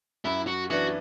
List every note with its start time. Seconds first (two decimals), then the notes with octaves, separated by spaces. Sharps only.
0.25 F#2 E4
0.47 F#4
0.70 E3 B3 D4 F#4